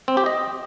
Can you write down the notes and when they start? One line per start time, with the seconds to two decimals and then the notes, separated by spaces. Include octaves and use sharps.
0.08 C4
0.17 G4
0.26 D#5